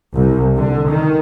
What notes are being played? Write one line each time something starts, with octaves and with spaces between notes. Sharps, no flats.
C2
D3
D#3